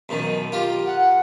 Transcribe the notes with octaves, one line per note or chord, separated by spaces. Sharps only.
F#2 B2 D#3
F4 G4 A#4
F#5